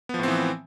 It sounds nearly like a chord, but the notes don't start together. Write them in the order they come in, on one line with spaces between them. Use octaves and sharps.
B3 F3 A2 C4 E3